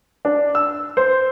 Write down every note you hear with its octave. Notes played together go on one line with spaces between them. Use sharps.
D4
E6
C5